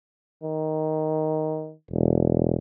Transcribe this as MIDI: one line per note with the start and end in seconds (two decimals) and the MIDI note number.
0.43 1.74 51
1.91 2.56 28